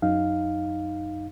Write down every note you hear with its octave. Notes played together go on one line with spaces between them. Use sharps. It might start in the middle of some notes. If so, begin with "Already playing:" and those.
F#2 D#4 F5